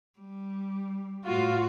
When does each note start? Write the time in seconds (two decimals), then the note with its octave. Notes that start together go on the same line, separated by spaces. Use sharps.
0.19 G3
1.25 A2 F4 F#4